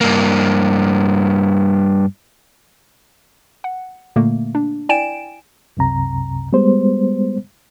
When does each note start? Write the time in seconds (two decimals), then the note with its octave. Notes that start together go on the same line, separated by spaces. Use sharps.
0.01 G2 A#3
3.64 F#5
4.16 A#2 D3 A3 A#3
4.55 D4
4.89 E4 D5 G5 G#5 D7 E7
5.77 C2 F#2 C3 A#5
6.53 G3 G#3 B3 C5